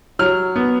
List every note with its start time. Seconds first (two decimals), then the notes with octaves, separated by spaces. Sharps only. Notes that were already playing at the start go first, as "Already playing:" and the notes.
0.19 F#3 F6
0.56 B3